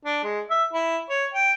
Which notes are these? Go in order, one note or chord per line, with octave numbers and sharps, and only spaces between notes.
D4
G#3
E5
E4
C#5
G5